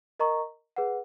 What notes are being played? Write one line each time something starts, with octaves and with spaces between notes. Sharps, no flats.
A#4 D#5 A#5 C#6
G#4 B4 F#5